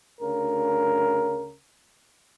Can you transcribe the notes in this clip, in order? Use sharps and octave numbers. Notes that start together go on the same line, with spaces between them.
D2 C#3 A#4